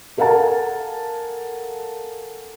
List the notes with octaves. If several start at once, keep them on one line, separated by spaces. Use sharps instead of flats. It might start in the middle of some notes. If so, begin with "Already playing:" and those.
A4 A#4 F5 F#5 G#5 A5